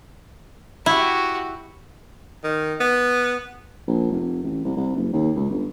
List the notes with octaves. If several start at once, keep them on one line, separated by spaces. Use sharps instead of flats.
E4 F#4 G4
D#3
B3
A#1
F1
A1
C2
C2
F#1
D#2
C#2
G1